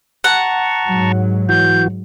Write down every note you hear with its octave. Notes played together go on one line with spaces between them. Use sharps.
F#5 A5 A#5 C#6
G#2 F#3
E3 F#4 G6